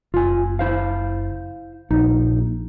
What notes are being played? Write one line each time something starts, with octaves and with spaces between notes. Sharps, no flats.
F#1 F4 G#5
E4 C5 F5
A#1 D#4